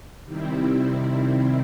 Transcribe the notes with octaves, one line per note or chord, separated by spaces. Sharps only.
C3 D#3 G3 C4 E4